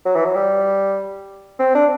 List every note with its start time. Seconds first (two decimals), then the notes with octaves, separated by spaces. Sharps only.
0.05 F#3
0.16 E3
0.25 F#3
0.35 G3
1.59 C4
1.75 D4